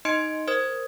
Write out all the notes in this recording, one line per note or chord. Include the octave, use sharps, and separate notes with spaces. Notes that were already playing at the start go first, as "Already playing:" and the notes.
D#4 D#5 C6 G#6 C#7 D7
A#4 C5 D#6 G#6